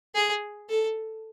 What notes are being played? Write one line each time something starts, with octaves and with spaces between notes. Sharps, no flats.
G#4
A4